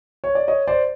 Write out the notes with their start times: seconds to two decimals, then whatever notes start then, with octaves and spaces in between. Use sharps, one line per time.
0.24 C#5
0.35 D5
0.48 C#5 D#5
0.67 C5 D5